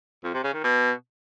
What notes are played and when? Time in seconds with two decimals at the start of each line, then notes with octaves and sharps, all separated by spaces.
0.24 F2
0.34 C3
0.44 C#3
0.54 D#3
0.64 B2